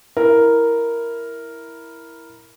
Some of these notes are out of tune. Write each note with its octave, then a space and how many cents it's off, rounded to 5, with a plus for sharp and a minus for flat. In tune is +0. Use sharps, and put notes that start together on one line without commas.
E4 +0 A#4 +0